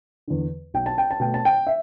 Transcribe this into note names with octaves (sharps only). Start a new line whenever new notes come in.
E2 D3
B1 G5
A5
G5
A5
B2 A3 G5
A5
G5
E5